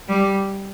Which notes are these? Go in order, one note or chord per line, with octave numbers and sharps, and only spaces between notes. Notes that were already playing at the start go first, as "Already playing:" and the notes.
G3